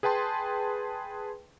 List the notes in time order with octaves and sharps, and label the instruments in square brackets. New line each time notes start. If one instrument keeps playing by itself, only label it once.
[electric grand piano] G#4 B4 G5 A5 C6